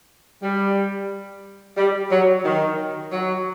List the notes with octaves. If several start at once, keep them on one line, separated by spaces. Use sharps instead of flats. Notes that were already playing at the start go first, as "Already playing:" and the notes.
G3
G3
F#3
D#3
F#3